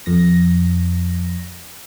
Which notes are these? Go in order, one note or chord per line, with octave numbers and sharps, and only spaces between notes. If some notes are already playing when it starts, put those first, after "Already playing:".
F2 A#6